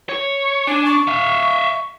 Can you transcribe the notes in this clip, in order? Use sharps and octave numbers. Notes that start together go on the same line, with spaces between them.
C#5
D4 G#5
C#6
E5 F5